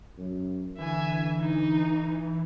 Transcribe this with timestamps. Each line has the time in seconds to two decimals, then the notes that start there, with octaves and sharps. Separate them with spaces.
0.18 F#2
0.78 D3 E3 E5 G#5
1.40 D#4